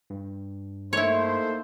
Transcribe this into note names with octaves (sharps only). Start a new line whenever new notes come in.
G2
A3 A#3 D#4 E4 C5 C#5